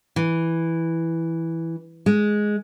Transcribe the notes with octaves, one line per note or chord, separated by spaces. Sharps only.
E3
G#3